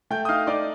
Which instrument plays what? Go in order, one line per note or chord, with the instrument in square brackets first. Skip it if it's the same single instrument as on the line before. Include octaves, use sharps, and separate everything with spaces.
[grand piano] A3 G5 G6
D#6
D#4 F5 F6
D#4 D5 D6